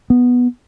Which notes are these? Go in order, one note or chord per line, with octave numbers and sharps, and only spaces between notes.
B3